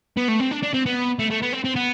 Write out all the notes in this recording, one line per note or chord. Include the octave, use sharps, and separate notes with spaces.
B3
A3
C4
D4
D4
C4
B3
A3
A3
B3
C4
C4
B3